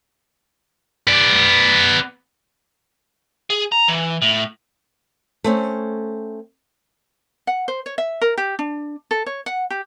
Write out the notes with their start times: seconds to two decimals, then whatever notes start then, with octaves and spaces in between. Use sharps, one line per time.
1.07 B3 D5
3.50 G#4
3.72 A#5
3.88 E3
4.22 A2
5.44 A3 C4 C#4
7.47 F#5
7.68 C5
7.86 C#5
7.98 E5
8.21 A#4
8.37 G4
8.59 D4
9.11 A4
9.26 C#5
9.46 F#5
9.70 G4